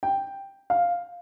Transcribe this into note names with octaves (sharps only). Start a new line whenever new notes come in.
G5
F5